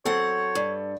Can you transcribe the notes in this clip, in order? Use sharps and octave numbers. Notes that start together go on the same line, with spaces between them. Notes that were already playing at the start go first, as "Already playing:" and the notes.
F#3 C4 A4 C#5 F#5
G2